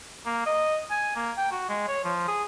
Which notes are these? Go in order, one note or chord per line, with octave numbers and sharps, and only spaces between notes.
A#3
D#5
G#5
A#3
G5
F#4
G#3
C#5
F3
G#4